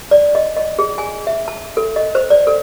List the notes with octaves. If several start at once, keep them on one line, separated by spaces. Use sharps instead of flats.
D5
D#5
D#5
G#4
G#5
E5
A5
A4
D#5
C5
D5
A4